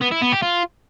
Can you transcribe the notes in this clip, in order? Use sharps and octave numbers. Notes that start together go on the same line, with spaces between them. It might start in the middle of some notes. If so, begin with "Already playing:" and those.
B3
E4
B3
G4
F4